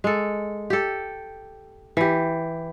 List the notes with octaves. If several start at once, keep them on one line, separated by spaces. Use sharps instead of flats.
G#3 A4
G4 A4
E3 G4